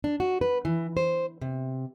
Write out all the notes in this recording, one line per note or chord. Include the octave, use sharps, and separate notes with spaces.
D4
F#4
B4
E3
C5
C3